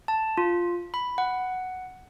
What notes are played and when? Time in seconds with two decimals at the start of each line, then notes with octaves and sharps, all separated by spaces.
0.08 A5
0.38 F4
0.94 B5
1.18 F#5